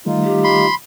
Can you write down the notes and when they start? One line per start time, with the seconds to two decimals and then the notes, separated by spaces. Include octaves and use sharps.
0.06 D#3 G3 A3 D#4 F4
0.24 G4
0.44 B5 C6